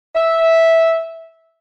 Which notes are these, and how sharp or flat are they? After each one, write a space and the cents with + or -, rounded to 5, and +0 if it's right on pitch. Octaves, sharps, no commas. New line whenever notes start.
E5 -10